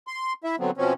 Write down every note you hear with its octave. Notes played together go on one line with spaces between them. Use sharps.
C6
E4 E5
D3 F#3 B3 C4
B2 F3 C4 C#4